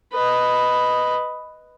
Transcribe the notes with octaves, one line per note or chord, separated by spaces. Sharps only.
B4 D#5